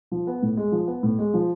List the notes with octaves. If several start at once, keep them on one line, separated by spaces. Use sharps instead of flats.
F3
B3
A2
G#3
F3
B3
A2
G#3
F3